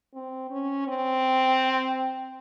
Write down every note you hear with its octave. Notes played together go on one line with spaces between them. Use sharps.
C4
C#4
C4